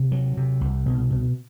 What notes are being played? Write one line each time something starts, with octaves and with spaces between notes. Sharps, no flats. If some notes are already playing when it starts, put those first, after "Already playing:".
Already playing: C3
F#3
C3
C2
B2
B2